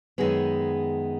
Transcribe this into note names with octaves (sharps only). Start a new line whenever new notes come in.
F#2 D#3 G#3 B3 G#4